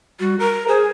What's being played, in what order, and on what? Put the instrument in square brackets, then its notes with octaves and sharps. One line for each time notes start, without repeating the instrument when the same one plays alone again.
[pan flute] G3 [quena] F#4
[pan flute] A#4 [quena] A#5
[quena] G#4 [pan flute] C5